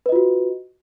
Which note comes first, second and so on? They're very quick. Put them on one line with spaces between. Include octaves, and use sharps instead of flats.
B4 D#5 F4 F#4